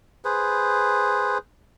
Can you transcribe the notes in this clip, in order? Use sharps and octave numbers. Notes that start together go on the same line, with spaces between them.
G#4 B4 C5